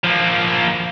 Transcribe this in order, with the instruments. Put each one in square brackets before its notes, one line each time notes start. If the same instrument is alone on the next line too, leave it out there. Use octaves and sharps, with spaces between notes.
[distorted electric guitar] F3 A#3